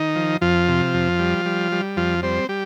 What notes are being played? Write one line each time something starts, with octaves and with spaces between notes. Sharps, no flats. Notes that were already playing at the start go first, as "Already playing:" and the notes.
Already playing: D#3 D#4
F3
F2 F3 F4
C3
F2
G3
G3
G3
F2 F3 F4
G3 C4 C5
G3 G4